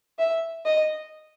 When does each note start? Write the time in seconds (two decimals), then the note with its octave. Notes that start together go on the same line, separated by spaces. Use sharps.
0.19 E5
0.65 D#5